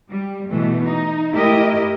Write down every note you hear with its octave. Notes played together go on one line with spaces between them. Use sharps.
G3
B2 E3 A3
D#4
A3 E4 G4 A#4 D#5